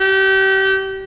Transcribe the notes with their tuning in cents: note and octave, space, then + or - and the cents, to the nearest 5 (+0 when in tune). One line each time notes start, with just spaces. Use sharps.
G4 -30